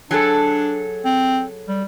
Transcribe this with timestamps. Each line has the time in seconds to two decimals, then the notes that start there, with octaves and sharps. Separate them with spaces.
0.11 F#3 D4 G#4 A4
1.05 C4
1.68 G3